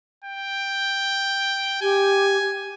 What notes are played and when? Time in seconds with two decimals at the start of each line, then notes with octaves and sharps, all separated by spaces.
0.24 G5
1.82 G4 G#5